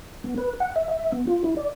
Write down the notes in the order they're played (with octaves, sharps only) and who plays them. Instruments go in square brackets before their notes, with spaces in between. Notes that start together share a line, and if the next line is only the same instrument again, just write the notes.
[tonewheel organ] B3
B4
F#5
E5
E5
B3
F4
E4
D5